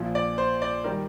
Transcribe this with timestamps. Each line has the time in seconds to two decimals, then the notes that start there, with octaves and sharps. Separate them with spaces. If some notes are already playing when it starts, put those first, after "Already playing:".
Already playing: A#1 A#2 F3
0.15 D5
0.38 C5
0.62 D5
0.84 D#3 G3 A#4